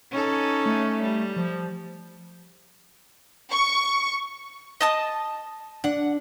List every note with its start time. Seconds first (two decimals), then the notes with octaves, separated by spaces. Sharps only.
0.11 C#4 D#4 A4
0.66 A3
1.02 G3
1.37 F3
3.52 C#6
4.81 D#5 A5 D#6
5.84 D4 F#5